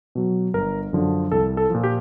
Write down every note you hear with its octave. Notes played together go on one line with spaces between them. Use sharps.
B2 F#3
G1 A#4
F#2 D3 F3
C2 A4
A4
A#2 F3
G4